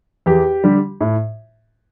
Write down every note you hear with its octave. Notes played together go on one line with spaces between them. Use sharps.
E2 G4
D3 G3
A2